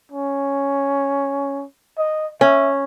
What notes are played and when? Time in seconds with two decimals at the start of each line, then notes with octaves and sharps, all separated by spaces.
0.12 C#4
1.98 D#5
2.41 C#4 E5